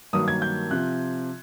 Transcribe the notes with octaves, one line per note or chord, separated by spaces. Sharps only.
G2 D#3 F#3 A#3 D#6
G#6
G6
C3 F3 F#6